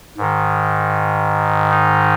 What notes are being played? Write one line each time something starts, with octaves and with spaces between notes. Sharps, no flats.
G#2 D#3
D#4